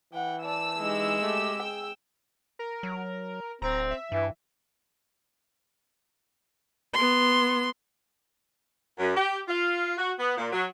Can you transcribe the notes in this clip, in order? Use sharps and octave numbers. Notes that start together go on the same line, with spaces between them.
E3 F#5 G5
D5 A5 E6
G#3 D#4 G4
A3 G4
G#4 G5
A#4
F#3
D1 C4 A#5
E5
G2 E3
B3 C6
F#2
G4
F4
F#4
B3
A#2
F#3